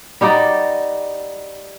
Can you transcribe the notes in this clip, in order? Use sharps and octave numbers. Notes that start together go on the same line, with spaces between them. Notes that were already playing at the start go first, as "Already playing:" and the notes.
G3 D#4 F#4 D5